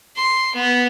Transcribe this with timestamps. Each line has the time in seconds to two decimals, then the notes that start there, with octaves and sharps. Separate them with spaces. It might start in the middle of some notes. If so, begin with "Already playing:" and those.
0.16 C6
0.55 B3